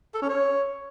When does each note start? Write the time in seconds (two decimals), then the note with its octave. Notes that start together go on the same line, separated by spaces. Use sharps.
0.15 A4
0.22 C#4
0.29 C#5